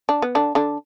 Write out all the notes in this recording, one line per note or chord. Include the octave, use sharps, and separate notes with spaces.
D4
B3
D3 D4
D3 D4